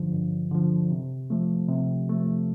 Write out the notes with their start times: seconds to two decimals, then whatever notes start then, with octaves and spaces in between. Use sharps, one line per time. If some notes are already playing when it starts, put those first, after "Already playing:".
Already playing: G2 D3 F3
0.12 G2
0.51 D3 F3
0.90 C3
1.30 F3 A3
1.69 C3
2.09 F3 A3